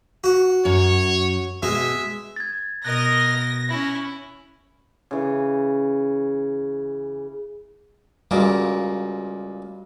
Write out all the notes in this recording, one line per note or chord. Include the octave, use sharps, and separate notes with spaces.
F#4
F#2 C#5
B2 G#3 E5
G#6 A6
B2 A#4 D#5 F#6 A#6
C#4 E4
C#3 E3
C#2 A#2 G3 A#3 F#4